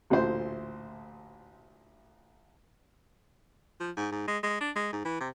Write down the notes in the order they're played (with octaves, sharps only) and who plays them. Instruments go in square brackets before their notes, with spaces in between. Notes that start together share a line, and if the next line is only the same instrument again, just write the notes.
[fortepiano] A1 D2 A#2 C5
[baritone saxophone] F3
G#2
G#2
G#3
G#3
D4
G#3
G#2
E3
C3